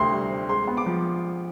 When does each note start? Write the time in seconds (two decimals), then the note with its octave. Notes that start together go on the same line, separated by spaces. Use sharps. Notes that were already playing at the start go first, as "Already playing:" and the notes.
Already playing: D2 C3 C4 C6
0.12 G3
0.31 C4
0.49 G#3 C6
0.67 B3
0.77 D6
0.86 F3